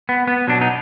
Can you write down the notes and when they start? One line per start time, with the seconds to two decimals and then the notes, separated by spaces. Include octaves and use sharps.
0.09 B3
0.27 B3
0.47 B2 F#3 D4
0.61 D#4